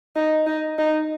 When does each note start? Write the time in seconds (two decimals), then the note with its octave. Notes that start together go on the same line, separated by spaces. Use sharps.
0.16 D#4
0.47 D#4
0.78 D#4